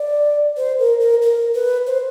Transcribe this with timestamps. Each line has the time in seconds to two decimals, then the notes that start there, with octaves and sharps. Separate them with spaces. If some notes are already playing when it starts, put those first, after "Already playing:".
Already playing: D5
0.57 C5
0.79 A#4
1.00 A#4
1.22 A#4
1.54 B4
1.87 C5